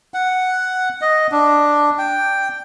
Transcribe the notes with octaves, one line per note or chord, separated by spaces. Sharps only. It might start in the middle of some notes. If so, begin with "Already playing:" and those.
F#5
D#5
D4
G5